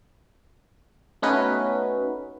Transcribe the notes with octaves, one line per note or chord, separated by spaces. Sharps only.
A3 B3 C#4 D#4 F#4 B4